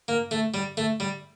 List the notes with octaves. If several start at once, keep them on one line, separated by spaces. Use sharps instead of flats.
A#3
A3
G3
A3
G3